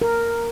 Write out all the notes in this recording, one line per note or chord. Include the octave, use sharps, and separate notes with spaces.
A#4